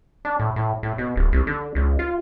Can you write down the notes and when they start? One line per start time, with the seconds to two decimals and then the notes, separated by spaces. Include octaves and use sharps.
0.25 D4
0.39 A2
0.56 A2
0.83 A2
0.98 B2
1.16 D1
1.32 C2
1.47 D3
1.75 C#2
1.99 F4